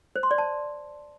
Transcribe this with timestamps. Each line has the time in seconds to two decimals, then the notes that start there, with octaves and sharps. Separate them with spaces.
0.16 C5
0.23 C6
0.31 D5
0.38 A5